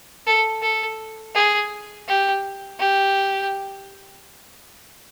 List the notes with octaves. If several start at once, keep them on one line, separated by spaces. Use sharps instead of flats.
A4
A4
G#4
G4
G4